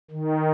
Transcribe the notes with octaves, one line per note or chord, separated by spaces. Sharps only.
D#3